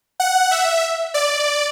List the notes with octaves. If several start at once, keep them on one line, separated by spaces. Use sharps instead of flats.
F#5
E5
D5